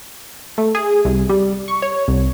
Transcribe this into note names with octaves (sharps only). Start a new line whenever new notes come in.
A3
G#4
C2
G3
C#6
C#5
C2